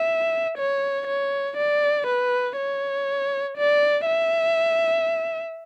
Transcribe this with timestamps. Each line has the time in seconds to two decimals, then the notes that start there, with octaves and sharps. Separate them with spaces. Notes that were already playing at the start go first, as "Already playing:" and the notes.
Already playing: E5
0.58 C#5
1.07 C#5
1.57 D5
2.07 B4
2.57 C#5
3.57 D5
4.06 E5